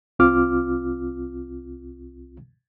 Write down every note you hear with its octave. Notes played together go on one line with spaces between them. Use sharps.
C2 C4 F4 D6 F6